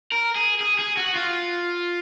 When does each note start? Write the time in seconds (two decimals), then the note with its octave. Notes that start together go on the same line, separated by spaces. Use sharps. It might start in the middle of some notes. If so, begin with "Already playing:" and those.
0.12 A#4
0.36 G#4
0.61 G#4
0.79 G#4
0.97 F#4
1.16 F4